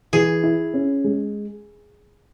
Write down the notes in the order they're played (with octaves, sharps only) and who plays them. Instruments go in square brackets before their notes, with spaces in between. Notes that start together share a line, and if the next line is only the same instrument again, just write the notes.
[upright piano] E3 [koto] G#4
[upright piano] E4
C#4
G#3